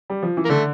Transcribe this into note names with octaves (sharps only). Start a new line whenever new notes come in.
G3
F3
E3
A#3
D3 A3